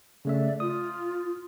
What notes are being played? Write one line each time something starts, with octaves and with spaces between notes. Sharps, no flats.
C#3 A3 D5 E5
F4 D#6